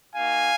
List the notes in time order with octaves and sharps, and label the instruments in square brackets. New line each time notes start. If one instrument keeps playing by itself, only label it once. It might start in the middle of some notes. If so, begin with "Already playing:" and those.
[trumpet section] A#3 D#4 F#4 F5 G#5